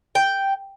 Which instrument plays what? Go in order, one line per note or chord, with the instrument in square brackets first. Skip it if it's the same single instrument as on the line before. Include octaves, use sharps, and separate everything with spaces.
[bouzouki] G5